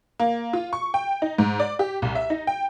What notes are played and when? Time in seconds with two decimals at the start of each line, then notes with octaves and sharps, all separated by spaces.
0.20 A#3
0.53 F4
0.73 C#6
0.94 G5
1.22 D#4
1.38 G#2
1.60 D5
1.79 G4
2.02 C2
2.15 E5
2.30 D#4
2.47 G5